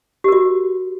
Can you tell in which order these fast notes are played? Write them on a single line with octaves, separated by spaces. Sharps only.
G4 A#4 F#4